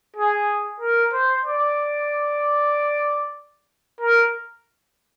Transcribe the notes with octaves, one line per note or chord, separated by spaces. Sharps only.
G#4
A#4
C5
D5
A#4